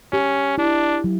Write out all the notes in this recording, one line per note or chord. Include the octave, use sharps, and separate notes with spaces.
C#4 G4
D4 E4
F#3